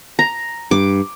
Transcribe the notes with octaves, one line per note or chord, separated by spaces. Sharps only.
A#5
G2 D6